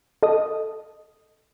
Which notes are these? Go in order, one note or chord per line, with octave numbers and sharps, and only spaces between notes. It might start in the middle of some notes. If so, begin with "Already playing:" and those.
A4 D#5 D#6